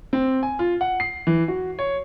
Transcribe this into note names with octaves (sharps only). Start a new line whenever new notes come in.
C4
G#5
F4
F#5
C7
E3
F#4
C#5